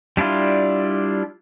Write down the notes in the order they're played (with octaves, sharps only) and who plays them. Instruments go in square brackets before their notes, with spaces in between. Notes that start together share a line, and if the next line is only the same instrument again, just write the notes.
[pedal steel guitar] G3 D4 E4 F4